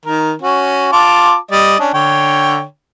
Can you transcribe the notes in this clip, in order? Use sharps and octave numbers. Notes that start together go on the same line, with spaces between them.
D#3 A#4
C#4 F#4
F4 A5 D6
G3 D5 D#5
C#4 D4
D3 C#5 G5